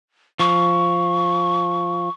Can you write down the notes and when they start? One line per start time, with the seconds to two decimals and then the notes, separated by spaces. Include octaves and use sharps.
0.40 F3 C#6